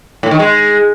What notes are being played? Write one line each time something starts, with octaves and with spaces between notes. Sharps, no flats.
A2
D#3
G#3